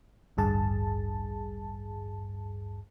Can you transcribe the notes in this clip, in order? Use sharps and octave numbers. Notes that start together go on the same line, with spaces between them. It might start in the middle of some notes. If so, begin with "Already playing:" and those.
A1 D2 G2 G#4 A5